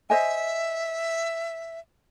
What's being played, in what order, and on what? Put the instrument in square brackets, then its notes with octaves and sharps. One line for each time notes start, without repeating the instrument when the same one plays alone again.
[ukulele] C5 D#5 G#5 [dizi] E5